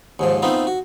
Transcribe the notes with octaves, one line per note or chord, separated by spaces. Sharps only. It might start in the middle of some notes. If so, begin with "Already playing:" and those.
D#2 G#2 F3
A3 B3 C4 D#4 F4
F#4